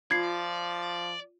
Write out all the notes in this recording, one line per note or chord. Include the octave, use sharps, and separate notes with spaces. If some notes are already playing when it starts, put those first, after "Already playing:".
F3 F4 D5 G#6 C7